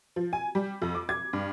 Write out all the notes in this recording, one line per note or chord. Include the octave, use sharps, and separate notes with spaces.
F3
G#5
G3
F2
D6
G#6
G2